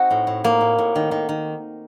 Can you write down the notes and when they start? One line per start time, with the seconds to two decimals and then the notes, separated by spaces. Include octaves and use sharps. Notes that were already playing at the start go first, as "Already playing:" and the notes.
Already playing: C4 D#4 F#4
0.11 A2
0.27 A2
0.44 A2 A#3
0.61 A2
0.78 A2
0.96 D#3
1.11 D#3
1.29 D#3